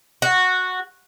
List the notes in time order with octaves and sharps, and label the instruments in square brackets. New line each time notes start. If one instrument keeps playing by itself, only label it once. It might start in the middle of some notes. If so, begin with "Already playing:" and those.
[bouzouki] F#4